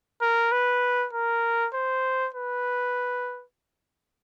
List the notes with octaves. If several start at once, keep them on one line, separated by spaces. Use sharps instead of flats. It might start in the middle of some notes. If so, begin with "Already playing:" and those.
A#4
B4
A#4
C5
B4